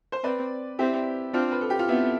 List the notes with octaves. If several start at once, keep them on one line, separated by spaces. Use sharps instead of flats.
C5
C4 B4 D5
C4 E4 G4
C4 D4 F4
B4
A4
G4
F4
B3 C4 E4